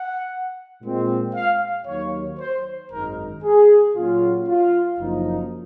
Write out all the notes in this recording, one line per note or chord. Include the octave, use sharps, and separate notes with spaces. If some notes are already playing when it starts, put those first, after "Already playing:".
Already playing: F#5
A#2 G#3 C4
F5
D#2 D#3 F#3 C#5
C5
G#1 F#2 D#3 G#3 D#4 A#4
G#4
A#2 F#3 C#4 F4
F4
F#1 F#2 F3 A#3 D#4